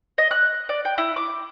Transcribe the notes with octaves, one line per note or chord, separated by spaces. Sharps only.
D#5
F#6
D5
G5
E4
D6